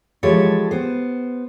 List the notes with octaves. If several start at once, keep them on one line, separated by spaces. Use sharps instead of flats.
E3 F3 G#3 G4 A4 C#5
B3 C5